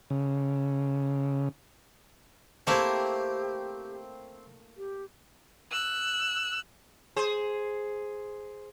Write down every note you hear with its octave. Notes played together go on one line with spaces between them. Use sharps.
C#3
A3 A#3 C4 E4 G4 C5
G4
E6 F#6
G#4 C5